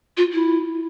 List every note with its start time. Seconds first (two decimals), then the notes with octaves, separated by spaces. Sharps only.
0.17 F4
0.33 E4